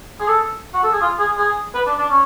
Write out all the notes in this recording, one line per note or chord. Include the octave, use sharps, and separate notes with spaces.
G#4
A4
F#4
A4
G#4
F4
G#4
G#4
B4
D4
D4
C#4